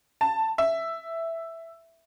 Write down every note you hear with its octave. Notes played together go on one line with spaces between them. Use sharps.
A5
E5